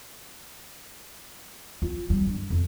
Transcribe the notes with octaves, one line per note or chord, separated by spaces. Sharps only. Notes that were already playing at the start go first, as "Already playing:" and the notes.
F4
G3
G2
F2